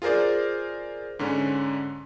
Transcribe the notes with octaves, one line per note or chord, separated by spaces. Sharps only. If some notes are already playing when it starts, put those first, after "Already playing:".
F4 G#4 A#4 C5 D5
G#2 D3 C#4